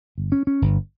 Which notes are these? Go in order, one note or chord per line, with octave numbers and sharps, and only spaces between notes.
G1
C#4
C#4
G1